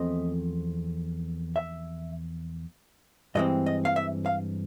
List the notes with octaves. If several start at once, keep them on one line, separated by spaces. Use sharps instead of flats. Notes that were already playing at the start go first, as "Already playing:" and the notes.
Already playing: E2 F3 A3 C4 D#5
E5
G2 E3 G#3 C4 D#5
D#5
F5
E5
F5